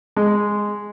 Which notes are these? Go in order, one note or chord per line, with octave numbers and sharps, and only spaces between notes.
G#3